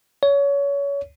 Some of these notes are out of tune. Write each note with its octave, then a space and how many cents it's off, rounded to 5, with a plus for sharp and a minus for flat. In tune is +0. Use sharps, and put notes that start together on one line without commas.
C#5 +25